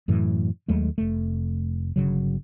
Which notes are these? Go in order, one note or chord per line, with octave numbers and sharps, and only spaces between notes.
F#2 A2 E3
D#2 F#3 G#3 A3
F1 A3
G1 C2 C#3 F#3